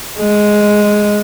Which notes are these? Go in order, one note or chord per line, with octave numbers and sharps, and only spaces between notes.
G#3